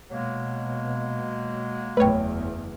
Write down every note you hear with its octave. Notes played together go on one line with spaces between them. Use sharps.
B2 F#3 G#3 A#3
F#1 E2 A3 B4 C#5 G5